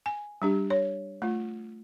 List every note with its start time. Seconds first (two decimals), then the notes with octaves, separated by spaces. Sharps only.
0.06 G#5
0.42 G3 D4 G4
0.70 C#5
1.22 A3 F4